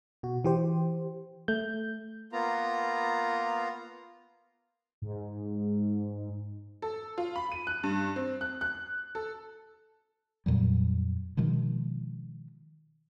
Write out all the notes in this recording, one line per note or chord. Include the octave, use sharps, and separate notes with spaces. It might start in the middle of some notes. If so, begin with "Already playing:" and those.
B2 F#4
E3 G4 C5
A3 G6
A#3 B3 F4 A#5
G#2
A4
F4
B5
D#7
F#6
G2
C4
F#6
F#6
A4
F2 A#2 F#3 G3
B2 D#3 F3 G#3